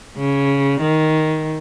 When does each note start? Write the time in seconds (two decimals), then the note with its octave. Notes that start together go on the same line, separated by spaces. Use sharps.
0.17 C#3
0.81 D#3